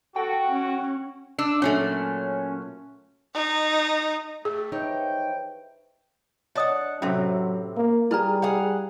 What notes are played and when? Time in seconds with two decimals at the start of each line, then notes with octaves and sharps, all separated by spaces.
0.16 F#4 A4 G5
0.48 C#4
1.38 D4 E6
1.62 A#2 F#3 A3 C#4
3.35 D#4
4.45 A3 G4 G#4
4.72 E3 F3 D#4 E4 C#5 G5
6.55 D4 C#5 D#5 F#5 D#6
7.02 A2 C3 F#3 C#4 C5 E5
7.77 A#3
8.11 G3 E4 G#4 B4 A#5
8.42 G#4 F5 F#5